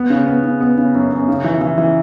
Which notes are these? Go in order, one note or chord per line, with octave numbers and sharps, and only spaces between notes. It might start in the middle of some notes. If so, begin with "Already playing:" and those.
Already playing: B3
C#3
B3
C#3
B3
C#3
F#2
F#2
C#3
E3
E3
E3